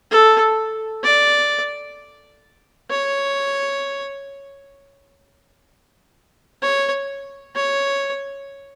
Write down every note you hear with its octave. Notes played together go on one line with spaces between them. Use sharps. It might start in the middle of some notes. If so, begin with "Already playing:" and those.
A4
D5
C#5
C#5
C#5